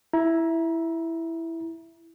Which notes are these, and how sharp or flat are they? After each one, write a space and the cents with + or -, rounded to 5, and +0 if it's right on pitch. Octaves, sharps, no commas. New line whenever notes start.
E4 +0 A#5 +30